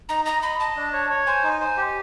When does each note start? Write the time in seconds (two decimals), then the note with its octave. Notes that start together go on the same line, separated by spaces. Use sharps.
0.09 D#4 A#5
0.26 D#5 A#5
0.42 D#5 B5
0.60 D#5 A5
0.76 D4
0.93 C#5
1.10 C#5
1.27 C5 G#5
1.44 D#4
1.60 C5
1.77 G4